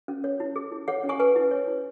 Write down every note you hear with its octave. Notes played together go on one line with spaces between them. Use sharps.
C#4
C#5
E4
G#4
E4
G#4 C#5 F#5
C#4
G#5 C#6
B4 G#5 C#6
E4
C#5
E4